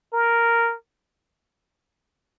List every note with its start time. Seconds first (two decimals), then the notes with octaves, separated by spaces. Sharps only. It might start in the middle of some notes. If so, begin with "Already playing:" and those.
0.13 A#4